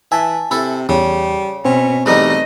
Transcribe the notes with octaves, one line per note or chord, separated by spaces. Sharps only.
E3 E5 G#5 A5
C3 E4 A4
E2 C#3 G3
B2 C4 C#4
E2 G3 A3 D#4 D#5